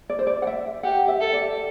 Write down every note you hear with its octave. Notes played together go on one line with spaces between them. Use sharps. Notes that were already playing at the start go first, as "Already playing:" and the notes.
D5
C5
D5
F#5
E5
G4 F#5
E5
A4
D5